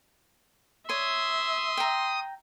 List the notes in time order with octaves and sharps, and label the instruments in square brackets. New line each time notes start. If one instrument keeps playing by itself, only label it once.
[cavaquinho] C#5 [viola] E5 [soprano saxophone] C6 [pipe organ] D#6
[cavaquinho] G5 A#5